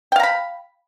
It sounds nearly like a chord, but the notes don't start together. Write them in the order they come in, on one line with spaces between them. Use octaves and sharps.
G5 F5 A#5 B5